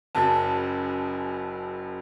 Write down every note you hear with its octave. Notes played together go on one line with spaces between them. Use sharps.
F#1 F#2 C#3 A5